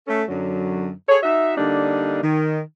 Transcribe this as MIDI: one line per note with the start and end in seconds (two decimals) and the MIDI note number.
0.08 0.23 57
0.08 0.23 61
0.08 0.23 69
0.28 0.90 42
0.28 0.90 50
0.28 0.90 54
1.09 1.18 68
1.09 1.18 69
1.09 1.18 73
1.23 1.54 63
1.23 1.54 66
1.23 1.54 76
1.57 2.23 50
1.57 2.23 55
1.57 2.23 58
1.57 2.23 62
1.57 2.23 63
2.23 2.60 51